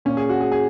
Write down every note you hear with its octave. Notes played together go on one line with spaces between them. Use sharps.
A#2 C#4
G#4
F#4
G#4
G#4